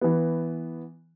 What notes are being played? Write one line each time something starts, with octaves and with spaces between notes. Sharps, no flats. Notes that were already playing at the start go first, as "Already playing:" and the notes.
E3 B3